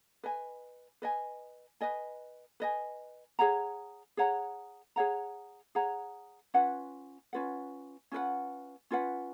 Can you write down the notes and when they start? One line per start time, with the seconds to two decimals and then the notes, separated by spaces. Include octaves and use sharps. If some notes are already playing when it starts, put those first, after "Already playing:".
0.24 B4 D#5 G#5
1.02 B4 D#5 G#5
1.81 B4 D#5 G#5
2.60 B4 D#5 G#5
3.39 G#4 C#5 F#5 A#5
4.17 G#4 C#5 F#5 A#5
4.96 G#4 C#5 F#5 A#5
5.75 G#4 C#5 F#5 A#5
6.54 C#4 F4 B4 F#5
7.33 C#4 F4 B4 F#5
8.12 C#4 F4 B4 F#5
8.91 C#4 F4 B4 F#5